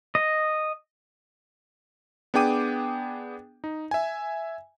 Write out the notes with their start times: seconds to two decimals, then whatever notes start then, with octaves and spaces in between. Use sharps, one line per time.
0.15 D#5
2.34 B3 D4 G#4 G5 D6 D#7
3.64 D#4
3.91 E5 G#5